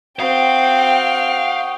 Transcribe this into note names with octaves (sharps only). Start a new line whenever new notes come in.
C4 F#4 F5 G5 D#6